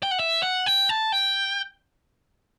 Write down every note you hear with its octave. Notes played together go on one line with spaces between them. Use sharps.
G5
F#5
E5
F#5
G5
A5
G5